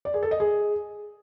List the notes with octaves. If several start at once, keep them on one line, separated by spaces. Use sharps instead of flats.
D5
G#4
A4
D#5
G#4